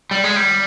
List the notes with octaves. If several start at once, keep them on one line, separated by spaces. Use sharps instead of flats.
G3
G#3
G3